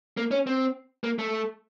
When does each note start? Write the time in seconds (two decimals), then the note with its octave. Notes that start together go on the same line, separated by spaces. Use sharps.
0.17 A#3
0.31 C#4
0.47 C4
1.04 A#3
1.19 A3